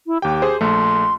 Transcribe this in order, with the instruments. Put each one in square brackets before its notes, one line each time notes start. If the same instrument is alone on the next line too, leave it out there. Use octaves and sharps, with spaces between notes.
[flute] E4
[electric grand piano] D#2 G5 [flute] G4
[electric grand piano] G#4 C5
[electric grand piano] A#1 A3 [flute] C6